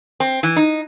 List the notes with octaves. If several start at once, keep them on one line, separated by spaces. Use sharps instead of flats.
C4
E3
D#4